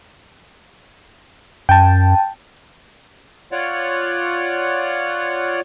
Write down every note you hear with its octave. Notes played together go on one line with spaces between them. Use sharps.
F#2 G5 A5
F4 C#5 D5 F#5